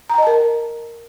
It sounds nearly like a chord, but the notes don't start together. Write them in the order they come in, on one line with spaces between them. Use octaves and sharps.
A#5 G5 D#5 A5 A#4